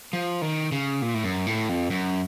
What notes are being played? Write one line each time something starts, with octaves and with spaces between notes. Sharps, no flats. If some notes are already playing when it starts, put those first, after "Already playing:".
F3
D#3
C#3
A#2
A2
F#2
A2
F2
F#2